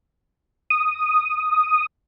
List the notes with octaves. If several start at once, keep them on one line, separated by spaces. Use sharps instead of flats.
D#6